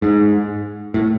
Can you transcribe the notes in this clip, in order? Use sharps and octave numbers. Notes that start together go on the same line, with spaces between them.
G#2
A2